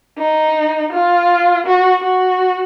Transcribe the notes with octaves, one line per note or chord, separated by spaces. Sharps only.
D#4
F4
F#4
F#4